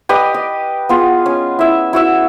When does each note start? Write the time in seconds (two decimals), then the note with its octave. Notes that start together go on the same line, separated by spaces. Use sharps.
0.09 G4 B4 D5 D#5
0.34 D#5
0.89 B3 F4 G#4
1.26 C#4
1.59 E4 E5
1.93 E4 F#4 E5